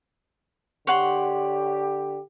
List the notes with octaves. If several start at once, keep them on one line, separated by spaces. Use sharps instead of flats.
D3 G4 C#5 F#5 C6